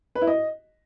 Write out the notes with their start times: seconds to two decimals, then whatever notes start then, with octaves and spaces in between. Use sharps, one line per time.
0.15 B4
0.21 E4
0.27 D#5